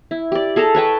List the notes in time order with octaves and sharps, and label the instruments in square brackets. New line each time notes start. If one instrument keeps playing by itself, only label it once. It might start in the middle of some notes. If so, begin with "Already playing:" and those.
[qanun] E4
G4 D5
G#4 A4 A5 A#5
B4 C#5 G5 A5